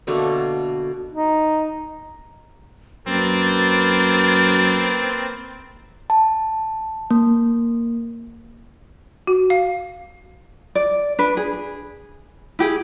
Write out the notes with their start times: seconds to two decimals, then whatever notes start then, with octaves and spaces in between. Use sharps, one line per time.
0.07 B2 D3 A3 A#3
1.12 D#4
3.08 F#2 A#3 C4 B4 A6
6.10 A5
7.11 A#3
9.27 F#4
9.50 F5
10.75 D5
11.19 D4 B4
11.37 G#4
12.59 E4 G4 G#4